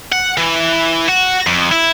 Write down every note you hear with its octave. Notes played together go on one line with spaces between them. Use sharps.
F#5
E3
F#4
F2
E4